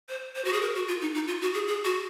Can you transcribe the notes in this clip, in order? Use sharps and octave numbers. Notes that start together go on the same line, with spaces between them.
C5
C5
F#4
G#4
A#4
F#4
F4
D#4
D#4
F4
F#4
G#4
G#4
F#4